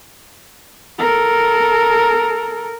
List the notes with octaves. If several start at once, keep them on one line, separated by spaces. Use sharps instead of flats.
A4 A#4